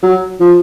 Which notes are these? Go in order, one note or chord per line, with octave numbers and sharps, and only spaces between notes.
F#3
F3